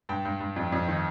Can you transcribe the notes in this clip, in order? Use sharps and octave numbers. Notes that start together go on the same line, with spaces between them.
G2 G5
G2
G2
F2
F2
D#3